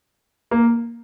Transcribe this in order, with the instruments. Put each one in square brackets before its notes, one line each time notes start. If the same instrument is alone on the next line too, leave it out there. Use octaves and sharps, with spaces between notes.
[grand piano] A#3